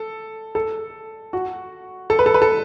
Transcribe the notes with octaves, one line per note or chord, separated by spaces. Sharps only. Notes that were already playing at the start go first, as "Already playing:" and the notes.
Already playing: A4
A4
F#4
A4
B4
A4
B4
A4